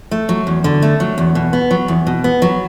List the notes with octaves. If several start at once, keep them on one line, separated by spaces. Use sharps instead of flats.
A3
F#3
E2
D3
A3
F#3
E2
B2
B3
F#3
E2
B2
B3
F#3